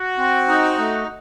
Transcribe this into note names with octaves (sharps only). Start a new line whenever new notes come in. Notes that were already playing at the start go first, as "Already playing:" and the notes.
Already playing: F#4
C4
D#4
A3